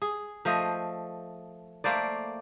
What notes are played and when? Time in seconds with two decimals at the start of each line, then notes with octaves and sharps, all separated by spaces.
0.02 G#4
0.45 F3 A3 C5 D#5
1.84 A3 A#3 C5 D5